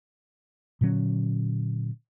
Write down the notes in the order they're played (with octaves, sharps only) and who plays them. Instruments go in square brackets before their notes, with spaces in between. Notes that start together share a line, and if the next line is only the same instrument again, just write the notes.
[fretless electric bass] A#2 D3 F#3 C#4